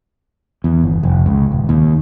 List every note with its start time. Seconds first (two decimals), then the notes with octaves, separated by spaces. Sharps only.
0.64 E2
0.84 G1
1.03 F1
1.26 C#2
1.52 D#1
1.69 D#2